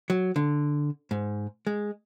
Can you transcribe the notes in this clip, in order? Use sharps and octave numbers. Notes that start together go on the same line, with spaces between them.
F#3
D3
G#2
G#3